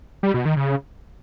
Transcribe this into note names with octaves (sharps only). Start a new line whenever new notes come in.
G3
B2
D#3
C#3